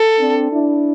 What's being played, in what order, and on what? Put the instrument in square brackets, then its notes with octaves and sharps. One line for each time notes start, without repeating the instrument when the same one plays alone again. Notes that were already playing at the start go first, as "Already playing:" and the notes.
Already playing: [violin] A4
[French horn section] C4 D4
D4 E4